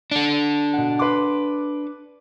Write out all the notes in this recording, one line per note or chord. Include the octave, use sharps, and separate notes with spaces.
D4 A4
B2 F#5
B4 C6 D6